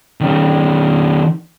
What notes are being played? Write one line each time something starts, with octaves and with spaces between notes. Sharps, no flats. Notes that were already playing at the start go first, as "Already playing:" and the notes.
D#3 C#4